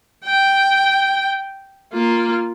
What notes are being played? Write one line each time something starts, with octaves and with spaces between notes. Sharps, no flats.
G5
A#3 F4